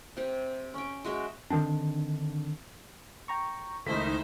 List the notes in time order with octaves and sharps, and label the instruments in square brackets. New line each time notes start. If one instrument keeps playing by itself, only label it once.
[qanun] C3 G4
C#4 G5
G#3 F#4 E5 G5
[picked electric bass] D3 D#3 C4 D4
[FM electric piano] G5 A#5 C#6
[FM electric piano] C#2 [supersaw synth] D#3 D#4 [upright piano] A3 B6 [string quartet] E4 C5 E5